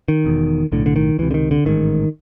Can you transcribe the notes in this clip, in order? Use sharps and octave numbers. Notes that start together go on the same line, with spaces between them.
D#3
E1 E2 B2
B1 A2 D3
D3
D#3
C#2 C3 E3
D3
D#3
D3
A1 G#2 D#3